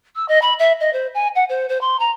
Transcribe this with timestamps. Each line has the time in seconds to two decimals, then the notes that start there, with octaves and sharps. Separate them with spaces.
0.15 E6
0.28 D#5
0.41 B5
0.59 E5
0.80 D#5
0.93 C5
1.14 G#5
1.35 F#5
1.49 C5
1.69 C5
1.81 C6
1.99 A#5